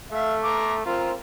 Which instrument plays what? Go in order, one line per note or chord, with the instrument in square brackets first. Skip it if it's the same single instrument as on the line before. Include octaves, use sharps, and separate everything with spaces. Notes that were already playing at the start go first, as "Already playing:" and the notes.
[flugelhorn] A3 [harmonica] E5 F5
[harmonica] A#5 D6
[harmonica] C4 A#4 [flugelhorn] F4